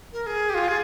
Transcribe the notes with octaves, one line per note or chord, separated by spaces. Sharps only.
A#4
A#4
G#4
G4
F4
G#4